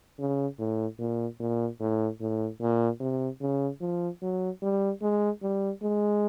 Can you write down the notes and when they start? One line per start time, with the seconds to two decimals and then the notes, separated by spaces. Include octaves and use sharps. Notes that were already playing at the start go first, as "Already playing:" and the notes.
0.19 C#3
0.59 A2
0.99 A#2
1.40 A#2
1.80 A2
2.20 A2
2.61 A#2
3.00 C3
3.41 C#3
3.81 F3
4.22 F#3
4.62 G3
5.02 G#3
5.43 G3
5.82 G#3